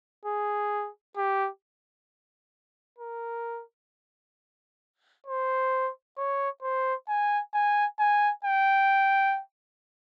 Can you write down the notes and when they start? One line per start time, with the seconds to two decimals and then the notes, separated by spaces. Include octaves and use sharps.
0.25 G#4
1.17 G4
2.99 A#4
5.26 C5
6.17 C#5
6.62 C5
7.08 G#5
7.54 G#5
7.99 G#5
8.45 G5